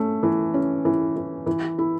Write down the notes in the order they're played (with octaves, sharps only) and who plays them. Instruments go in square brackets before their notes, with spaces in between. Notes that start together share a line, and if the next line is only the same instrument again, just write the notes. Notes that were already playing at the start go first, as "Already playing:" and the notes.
Already playing: [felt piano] A3 C#4
E3
C#4
E3
E3
E3
E4